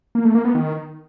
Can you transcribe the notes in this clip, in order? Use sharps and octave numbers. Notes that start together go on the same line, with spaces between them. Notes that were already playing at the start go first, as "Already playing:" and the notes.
A#3
A3
A#3
B3
D#3